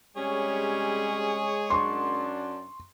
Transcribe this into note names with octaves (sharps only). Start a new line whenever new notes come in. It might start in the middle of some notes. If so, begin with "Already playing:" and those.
C3 G3 G#3 C#4 G#4 C#5
F#2 D4 C6 C#6